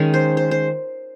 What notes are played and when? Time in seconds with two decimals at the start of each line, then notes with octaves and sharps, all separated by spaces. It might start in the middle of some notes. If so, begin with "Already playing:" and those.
Already playing: D#3 G#3 C#4
0.14 C5
0.37 C5
0.51 C5